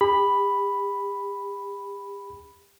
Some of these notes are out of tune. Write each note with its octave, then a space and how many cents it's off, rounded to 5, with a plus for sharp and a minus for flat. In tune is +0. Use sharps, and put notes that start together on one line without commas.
G4 +40 B5 +0